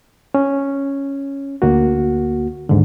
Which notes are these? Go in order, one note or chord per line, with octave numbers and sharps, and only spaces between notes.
C#4
D2 A#3 F#4
D#2 G#2 D3